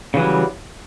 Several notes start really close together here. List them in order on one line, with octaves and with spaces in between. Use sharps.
C#3 E3 F#3 G3